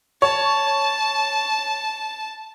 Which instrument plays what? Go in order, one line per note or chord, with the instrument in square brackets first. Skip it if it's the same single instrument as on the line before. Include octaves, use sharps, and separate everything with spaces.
[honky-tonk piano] C#5 [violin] A5